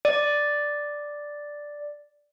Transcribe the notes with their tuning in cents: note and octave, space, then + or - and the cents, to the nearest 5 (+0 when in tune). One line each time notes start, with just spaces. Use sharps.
D5 +0